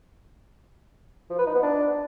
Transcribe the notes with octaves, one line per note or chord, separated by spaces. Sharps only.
F3
B4
D#4
B3
D4